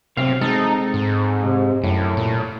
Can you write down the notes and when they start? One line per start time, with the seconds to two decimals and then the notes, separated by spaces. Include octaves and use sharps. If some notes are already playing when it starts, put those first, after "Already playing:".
0.17 B1 C3 C4 F5
0.41 G#3 C4 D#4 A4
0.94 G#2
1.43 C3
1.84 F#2 A2
2.17 A#2